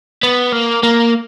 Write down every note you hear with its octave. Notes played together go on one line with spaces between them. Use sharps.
B3
A#3
A#3